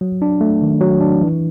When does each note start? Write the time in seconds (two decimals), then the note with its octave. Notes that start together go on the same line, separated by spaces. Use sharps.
0.01 F#3
0.22 D4
0.41 A3
0.62 D#3
0.81 F#3
1.01 D4
1.22 E3